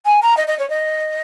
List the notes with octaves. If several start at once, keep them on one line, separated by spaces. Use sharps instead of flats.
G#5
A#5
D#5
D#5
C#5
D#5